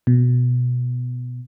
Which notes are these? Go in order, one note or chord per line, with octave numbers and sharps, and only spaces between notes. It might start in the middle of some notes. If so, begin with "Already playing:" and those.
B2